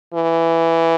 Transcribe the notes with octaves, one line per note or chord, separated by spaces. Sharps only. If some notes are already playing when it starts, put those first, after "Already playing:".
E3